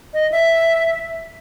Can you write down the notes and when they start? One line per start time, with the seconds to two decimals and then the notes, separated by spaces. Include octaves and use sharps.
0.14 D#5
0.32 E5